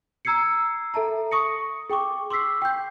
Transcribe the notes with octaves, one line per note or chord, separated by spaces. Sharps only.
A#5 E6 G#6 C7 C#7
A4 E5 A5 A#5
C#6 D#6 A#6 C#7
G#4 G5 C#6 D6
C6 D6 E6 B6 C7
G5 G6